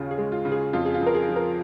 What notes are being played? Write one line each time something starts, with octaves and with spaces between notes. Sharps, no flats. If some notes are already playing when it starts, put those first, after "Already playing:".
Already playing: D#2 C#3 C#4 F4 G#4
G#4
G#3
F4
C#3
G#4
F2 F4
G#4
F4
F2
A#4
G#4
F3
A#4